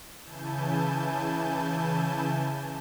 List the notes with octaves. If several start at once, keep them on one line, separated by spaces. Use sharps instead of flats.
C#3 E3 E4 G#5 A5 G6